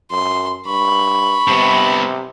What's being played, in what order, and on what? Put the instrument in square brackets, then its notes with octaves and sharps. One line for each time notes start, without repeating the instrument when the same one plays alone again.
[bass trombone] F#2 [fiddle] C6
[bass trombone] G2 [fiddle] B5 [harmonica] C#6
[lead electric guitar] G2 B3 [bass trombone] C3